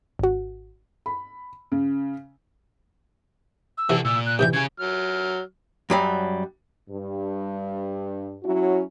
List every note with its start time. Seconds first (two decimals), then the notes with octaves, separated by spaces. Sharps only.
0.19 G#1 F#4
1.06 B5
1.72 C#3
3.78 E6
3.89 C3 E3 F#4 A4
4.05 A#2 E6
4.26 F#6
4.39 G2 C3 E3 G6
4.53 C#3 G#4 G#6
4.80 F#3 F6
5.90 F#2 F#3 G3
6.90 G2
8.43 F#3 C#4 E4 F#4